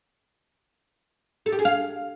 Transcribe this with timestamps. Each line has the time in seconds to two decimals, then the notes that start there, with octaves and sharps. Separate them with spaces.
1.46 A4
1.52 G4
1.59 G#4
1.65 F5